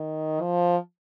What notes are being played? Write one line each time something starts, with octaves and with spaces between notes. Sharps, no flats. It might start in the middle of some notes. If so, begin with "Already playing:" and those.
Already playing: D#3
F3